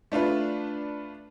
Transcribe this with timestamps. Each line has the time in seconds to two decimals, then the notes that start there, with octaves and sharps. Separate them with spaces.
0.12 A3 D4 F4 B4